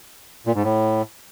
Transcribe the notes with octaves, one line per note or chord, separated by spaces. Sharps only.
A#2
G#2
A2